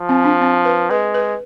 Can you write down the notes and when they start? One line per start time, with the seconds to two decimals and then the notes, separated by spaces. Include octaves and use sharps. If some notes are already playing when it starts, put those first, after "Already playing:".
Already playing: F3
0.09 C4
0.24 D4
0.41 C4
0.65 B4
0.90 G#3 B4
1.14 B4